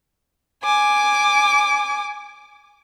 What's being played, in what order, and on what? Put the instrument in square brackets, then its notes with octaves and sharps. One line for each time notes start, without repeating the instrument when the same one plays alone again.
[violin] G#5 D6